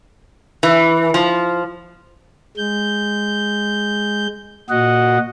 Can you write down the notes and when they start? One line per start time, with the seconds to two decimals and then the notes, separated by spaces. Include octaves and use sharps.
0.63 E3
1.14 F3
2.57 G#3 G6
4.69 A#2 F#4 D#5 F#5